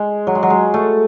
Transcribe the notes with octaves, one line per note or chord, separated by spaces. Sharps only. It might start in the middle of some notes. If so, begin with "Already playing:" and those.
Already playing: G#3
F#3
G#3
F#3
G#3
A3